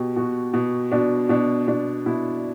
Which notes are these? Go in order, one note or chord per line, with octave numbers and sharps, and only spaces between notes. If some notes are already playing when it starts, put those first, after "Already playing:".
Already playing: B2 G4
B2 F#4
B2
B2 D4
B2 D4
B2 D4
B2 E4